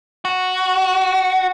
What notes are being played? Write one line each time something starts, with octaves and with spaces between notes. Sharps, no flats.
F#4